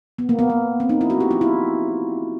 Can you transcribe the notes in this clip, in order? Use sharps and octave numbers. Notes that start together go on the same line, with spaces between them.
B3
A#3
B3
B3
C4
D#4
E4
F#4
G4
F4
E4